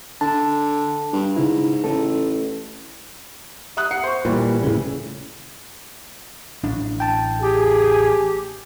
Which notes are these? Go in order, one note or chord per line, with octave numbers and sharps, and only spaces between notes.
D3 A5
G2
G#2 C#3 E4
A1 A4
E5 D#6 F#6
F#5 C7 C#7
C5 C#6
A#2 E3 G3
A2 C#3
A1 D4
G5 A5
G4 G#4